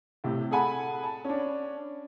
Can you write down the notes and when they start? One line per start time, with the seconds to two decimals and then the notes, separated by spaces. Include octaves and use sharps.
0.24 A2 C3
0.51 G#4 A4 F#5 G#5 A5 B5
1.04 A5
1.24 C#4 D4